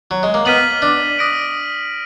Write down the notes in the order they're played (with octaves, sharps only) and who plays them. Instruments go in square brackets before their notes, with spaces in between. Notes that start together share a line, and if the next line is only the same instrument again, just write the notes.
[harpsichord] F#3
G#3
A#3
[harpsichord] B3 [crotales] F6 B6 D#7 F#7
[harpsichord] D4
[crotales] D#6 A#6 D7